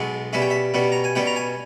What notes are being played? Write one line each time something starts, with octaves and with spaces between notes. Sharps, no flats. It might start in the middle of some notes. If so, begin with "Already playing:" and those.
Already playing: B1 B2 G#3
B2 G3 C#4 E5
G5
E5
B2 G3 C#4
A#5
G#5
B2 G3 C#4 G5
A#5
G#5